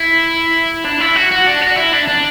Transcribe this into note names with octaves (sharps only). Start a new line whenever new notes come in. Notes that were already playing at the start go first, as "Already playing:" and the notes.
Already playing: E4
D4
E4
F#4
F#4
D4
F#4
E4
D4
D4